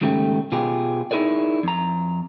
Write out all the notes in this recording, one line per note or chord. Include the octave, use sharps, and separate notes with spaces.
D#2 G#2 C#3 A3 G4
B2 F4 G4 G#4
D#4 E4 G#4 A#4 D5
F2 A#5